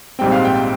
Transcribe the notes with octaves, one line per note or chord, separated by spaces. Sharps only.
A#1 G#2 G3 C4 G5
F5
G5